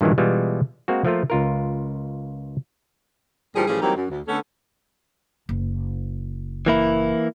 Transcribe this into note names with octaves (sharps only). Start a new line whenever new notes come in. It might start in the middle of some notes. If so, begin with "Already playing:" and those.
G2 A#2 D#3 E3 F#3 G#3
B2 E3 G3 G#3 F4
G#3 A#3 C4 F#4
F3 A3 A#3 F4
C#2 F4 A#4
D2 A#2 E3 F3 G3 G#4
A2 E3 F3 G3 C#4 G#4
E3 F#3 G3 A#3 C4 D#4
F#2
D2
D3 A3 B3 C#4 A4
F#1
E3 A#3 E4